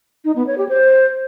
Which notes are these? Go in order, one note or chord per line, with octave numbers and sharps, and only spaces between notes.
D#4
B3
C#5
G4
C5